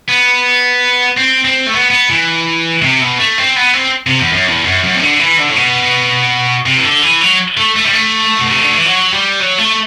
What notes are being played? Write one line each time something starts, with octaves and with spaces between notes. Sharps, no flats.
B3
C4
C4
A3
B3
B3
E3
C3
B2
A3
C4
B3
C4
C3
E2
F#2
E2
F#2
F#2
C3
D3
E3
D3
A2
B2
C3
E3
D3
E3
F#3
A3
A3
G3
A3
B2
C3
D3
E3
F#3
G3
F#3
A3